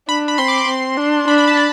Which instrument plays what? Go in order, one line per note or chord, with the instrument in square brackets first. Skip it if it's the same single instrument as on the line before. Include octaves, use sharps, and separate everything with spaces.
[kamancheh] D4 [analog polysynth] B5
[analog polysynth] B5
[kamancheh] C4 [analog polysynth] C6
[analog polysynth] D6
C6
[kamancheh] C4 [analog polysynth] C6
[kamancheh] D4
[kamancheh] D4 [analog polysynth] B5
[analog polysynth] B5
A5
B5